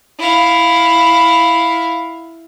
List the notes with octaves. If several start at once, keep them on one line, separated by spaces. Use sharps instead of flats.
E4 F5